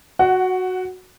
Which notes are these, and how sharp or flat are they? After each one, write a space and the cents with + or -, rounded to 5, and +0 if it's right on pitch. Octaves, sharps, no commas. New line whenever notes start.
F#4 -5 F#5 +15